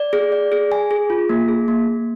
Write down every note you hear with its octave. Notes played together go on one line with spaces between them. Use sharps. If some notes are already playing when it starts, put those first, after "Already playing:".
Already playing: D5
G#4
D5
G#4
G#5
G#4
F4
A#3
G#4
A#3
A#3